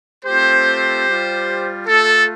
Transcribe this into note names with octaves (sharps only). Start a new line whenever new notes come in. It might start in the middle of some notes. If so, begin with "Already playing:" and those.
A3 C4 F4 G4 C5
G3 F4
A3 F4 A4